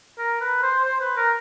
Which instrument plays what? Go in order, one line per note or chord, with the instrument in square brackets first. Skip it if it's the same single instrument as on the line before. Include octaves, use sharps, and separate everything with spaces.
[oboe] A#4
B4
C5
C5
B4
A#4